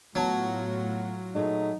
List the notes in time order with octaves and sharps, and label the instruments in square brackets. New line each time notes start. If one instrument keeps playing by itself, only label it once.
[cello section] A2 F4 F#4 [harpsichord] F#3 [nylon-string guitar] B3 F#5 A5
[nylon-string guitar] A#2 A3 G#4 [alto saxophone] D#4